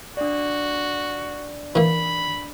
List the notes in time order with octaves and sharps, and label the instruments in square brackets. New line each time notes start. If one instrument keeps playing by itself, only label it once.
[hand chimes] D4 D5 [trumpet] F#4
[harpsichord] E3 A#3 [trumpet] B5